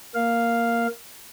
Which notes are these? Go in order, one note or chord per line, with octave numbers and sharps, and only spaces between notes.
A#3 F5